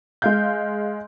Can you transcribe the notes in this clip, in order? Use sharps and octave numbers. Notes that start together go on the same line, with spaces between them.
G#3 F5 G6